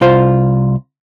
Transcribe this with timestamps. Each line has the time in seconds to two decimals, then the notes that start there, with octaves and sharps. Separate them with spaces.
0.01 C2 F4 C5